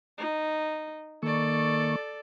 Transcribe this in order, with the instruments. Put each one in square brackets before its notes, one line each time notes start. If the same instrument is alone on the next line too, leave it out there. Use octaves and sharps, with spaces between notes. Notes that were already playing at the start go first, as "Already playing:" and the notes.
[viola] D#4
[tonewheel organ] D#3 A#3 C#6 [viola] A4 D5